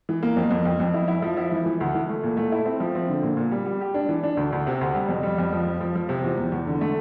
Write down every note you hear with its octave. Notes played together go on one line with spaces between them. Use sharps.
E3
A#3
F2
F2
F2
F2
E4
E4
F3
E4
E3
E3
D2
E3
A3
A#2
A3
E4
C4
F3
C4
D3
A#2
A#2
G3
G3
G4
D4
E3
D4
D2
D2
C3
D2
G3
F2
G3
F2
F3
F3
F3
F3
C3
E2
E2
E2
D3
A3